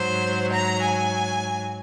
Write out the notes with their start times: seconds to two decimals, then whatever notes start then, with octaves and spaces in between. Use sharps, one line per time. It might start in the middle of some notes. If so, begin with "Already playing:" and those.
Already playing: G#2 F#3 C5
0.51 A#5
0.80 G#5